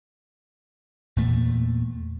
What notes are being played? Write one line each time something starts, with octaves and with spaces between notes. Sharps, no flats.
E2 A#2 A3